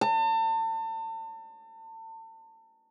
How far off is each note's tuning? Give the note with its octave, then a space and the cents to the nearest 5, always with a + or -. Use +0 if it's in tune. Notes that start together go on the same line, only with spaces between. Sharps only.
A5 +35